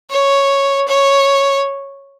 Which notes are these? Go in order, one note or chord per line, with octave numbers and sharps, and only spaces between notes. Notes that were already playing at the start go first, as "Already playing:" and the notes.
C#5
C#5